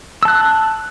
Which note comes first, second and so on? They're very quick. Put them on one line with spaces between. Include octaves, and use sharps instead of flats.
E6 A5 F#6